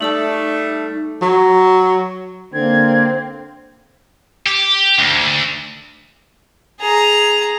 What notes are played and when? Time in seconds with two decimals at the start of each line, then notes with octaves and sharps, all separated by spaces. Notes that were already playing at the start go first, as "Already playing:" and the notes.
0.01 G3 A3 D#4 A4 A5
1.22 F#3
2.54 D3 A#3 C4 G#6
4.47 G4
4.99 D2
6.81 G#4 A#5